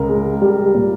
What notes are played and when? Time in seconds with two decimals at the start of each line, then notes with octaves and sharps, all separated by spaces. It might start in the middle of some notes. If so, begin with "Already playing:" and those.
Already playing: C#2 A#4
0.09 G#3
0.42 G3
0.74 A#2